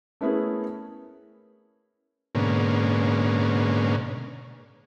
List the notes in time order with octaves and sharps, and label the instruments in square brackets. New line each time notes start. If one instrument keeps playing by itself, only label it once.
[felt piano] A3 B3 C#4 E4 G#4 A#4
[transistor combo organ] G#2 B2 D3 A#3 C#4